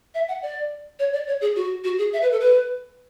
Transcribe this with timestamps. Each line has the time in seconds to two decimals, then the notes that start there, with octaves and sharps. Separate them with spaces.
0.15 E5
0.28 F#5
0.42 D5
0.99 C#5
1.13 D5
1.27 C#5
1.41 G#4
1.56 F#4
1.84 F#4
1.98 G#4
2.13 E5
2.22 B4
2.32 A4
2.41 B4